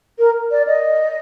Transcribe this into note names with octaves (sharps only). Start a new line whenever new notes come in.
A#4
D5
D#5